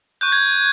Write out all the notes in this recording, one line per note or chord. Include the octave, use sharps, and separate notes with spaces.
C#6 F#6 G6
G#6